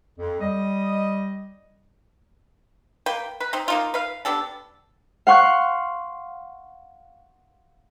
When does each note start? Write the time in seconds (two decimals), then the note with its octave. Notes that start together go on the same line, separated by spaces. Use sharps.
0.18 F2
0.40 G3 D#5
3.06 A#3 B4 G5
3.40 B4
3.53 C4 D#4
3.68 A#3 D#4 F4
3.94 B4 F5
4.25 B3 D4 G4 A4
5.27 F5 F#5 C6 C#6 F#6